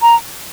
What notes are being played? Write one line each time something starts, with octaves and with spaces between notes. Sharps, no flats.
A#5